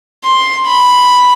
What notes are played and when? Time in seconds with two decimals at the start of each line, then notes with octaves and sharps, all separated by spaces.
0.24 C6
0.66 B5